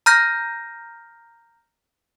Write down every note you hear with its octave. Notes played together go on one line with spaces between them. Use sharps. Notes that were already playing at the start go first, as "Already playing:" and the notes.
A#5 F6 G6 A#6